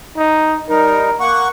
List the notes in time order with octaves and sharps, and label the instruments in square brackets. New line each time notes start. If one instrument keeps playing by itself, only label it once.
[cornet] D#4
[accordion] G3 D#4 [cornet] A#4
[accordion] A#3 F#5 C#6